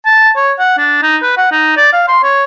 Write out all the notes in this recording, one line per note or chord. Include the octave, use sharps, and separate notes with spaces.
A5
C#5
F#5
D4
D#4
B4
F#5
D#4
D5
F5
C6
C#5